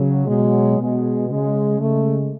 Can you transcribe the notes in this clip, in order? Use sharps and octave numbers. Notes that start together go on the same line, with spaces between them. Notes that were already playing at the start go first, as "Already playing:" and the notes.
Already playing: C#3 F#3
B2 F#3 G#3
B2 G#3
C#3 G#3
C#3 G#3 A3